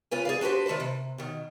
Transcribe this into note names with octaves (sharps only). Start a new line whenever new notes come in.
C#3 F4 B4 G#5
G#4 D5 F5
D4 F#4 G4 B4 C5
D#3 A3 D4 B4 C5
C3
B2 D#3